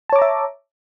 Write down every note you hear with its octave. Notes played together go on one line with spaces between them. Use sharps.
C#5 E5 A5 A#5 D6